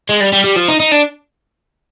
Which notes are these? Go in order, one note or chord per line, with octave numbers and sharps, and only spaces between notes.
G#3
G3
G3
G3
F3
D#4
D#4
D4